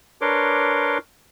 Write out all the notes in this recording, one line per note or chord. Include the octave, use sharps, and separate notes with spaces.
D4 A#4 B4 C#5 C6 D6